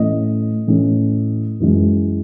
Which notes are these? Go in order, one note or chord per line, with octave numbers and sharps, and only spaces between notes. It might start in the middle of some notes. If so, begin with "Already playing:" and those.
Already playing: A2 E3 A3 C#4 D#5
A2 E3 A3 C#4
F#2 E3 G#3